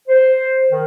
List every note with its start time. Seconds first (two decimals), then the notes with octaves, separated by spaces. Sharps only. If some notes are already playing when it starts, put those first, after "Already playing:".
0.08 C5
0.70 D#3